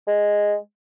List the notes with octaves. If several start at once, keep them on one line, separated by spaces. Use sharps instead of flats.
G#3